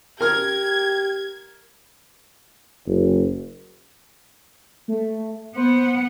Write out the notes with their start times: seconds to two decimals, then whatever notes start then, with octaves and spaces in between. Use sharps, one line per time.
0.21 G4 A#4 F6 G#6
2.87 F#1
4.88 A3
5.55 B3 C5 F#5